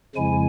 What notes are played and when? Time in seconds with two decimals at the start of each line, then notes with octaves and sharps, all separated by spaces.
0.15 F2 C#3 F3 G#3 E4 G#5